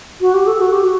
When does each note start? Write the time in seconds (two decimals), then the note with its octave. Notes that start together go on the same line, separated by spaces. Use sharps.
0.21 F#4
0.34 G4
0.47 A4
0.60 F#4
0.73 G4
0.84 F#4